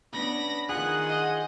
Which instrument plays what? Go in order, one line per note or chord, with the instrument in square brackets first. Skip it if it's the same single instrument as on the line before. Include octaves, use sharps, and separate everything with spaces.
[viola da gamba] B3 C#4 D4 [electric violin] B5 A#6
[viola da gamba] D#3 F4 [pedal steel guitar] G#4 [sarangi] F#5 [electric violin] F#6
[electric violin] C5 D#5